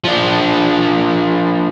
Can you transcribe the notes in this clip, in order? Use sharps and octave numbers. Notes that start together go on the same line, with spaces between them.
F3 D4